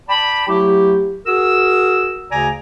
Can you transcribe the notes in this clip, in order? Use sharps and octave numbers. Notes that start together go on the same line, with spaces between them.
D5 G5 A5 B5
F#3 A3 E4 G4
F#4 G#4 A#4 E6
D2 C#3 D5 G#5 A#5